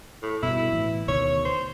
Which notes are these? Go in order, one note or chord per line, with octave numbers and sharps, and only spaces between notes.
A2
G2 B2 E4
A2 E3
D2 B2 D#3 C#5
C5